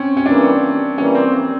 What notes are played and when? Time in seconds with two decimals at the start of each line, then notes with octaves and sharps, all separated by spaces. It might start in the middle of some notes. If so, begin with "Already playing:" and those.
Already playing: C4 C#4
0.17 C#4
0.26 E3 G3 A#3 D4
0.98 E3 G3 A#3 C#4
1.15 C4
1.34 C4